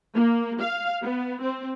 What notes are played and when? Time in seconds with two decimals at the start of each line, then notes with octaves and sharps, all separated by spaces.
0.14 A#3
0.61 F5
1.03 B3
1.42 C4